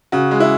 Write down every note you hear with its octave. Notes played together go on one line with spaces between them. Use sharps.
C#3 F#4
G#3
E4